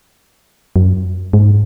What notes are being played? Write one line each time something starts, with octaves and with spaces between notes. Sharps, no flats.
F#2
G#2